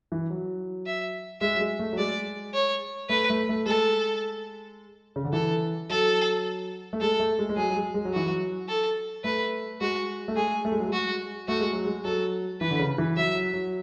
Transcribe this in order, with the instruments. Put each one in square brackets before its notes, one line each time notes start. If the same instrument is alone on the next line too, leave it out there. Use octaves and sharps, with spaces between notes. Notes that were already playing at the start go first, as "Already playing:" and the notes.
[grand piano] E3
F#3
[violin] E5
[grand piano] G#3 [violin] E5
[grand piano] F#3
G#3
A3
F#3
[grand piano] G#3 [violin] D5
[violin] C#5
[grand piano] A3 [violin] B4
[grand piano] A3
A3
[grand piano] G#3 [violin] A4
[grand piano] C#3
D3
[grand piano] E3 [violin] A4
[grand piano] F#3 [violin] A4
[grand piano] A3
[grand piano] G#3 [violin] A4
[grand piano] A3
G#3
G#3
[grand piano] F#3 [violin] G#4
[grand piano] F#3
G#3
G#3
F#3
[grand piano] E3 [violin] F#4
[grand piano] F#3
[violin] A4
[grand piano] A3 [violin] B4
[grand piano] G#3 [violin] F#4
[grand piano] A3
[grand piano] G#3 [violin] G#4
[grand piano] A3
G#3
F#3
[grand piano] G#3 [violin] F#4
[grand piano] A3 [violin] F#4
[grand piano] G#3
F#3
G#3
[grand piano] F#3 [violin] A4
[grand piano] E3 [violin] B4
[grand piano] D3
C#3
E3
[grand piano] F#3 [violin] E5
[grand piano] F#3
F#3